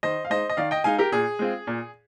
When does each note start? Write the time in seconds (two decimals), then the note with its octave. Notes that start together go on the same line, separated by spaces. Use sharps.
0.03 D#3 C5 D#5
0.25 F5
0.30 G#3 D#4 C5 D#5
0.50 D#5
0.57 D#3 D5 F5
0.71 D#5 G5
0.84 G#3 D#4 F5 G#5
0.98 G4 A#4
1.12 A#2 G#4
1.39 G#3 C4 F4
1.67 A#2